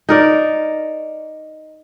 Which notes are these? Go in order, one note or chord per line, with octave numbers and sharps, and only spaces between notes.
D#4 A#4 D5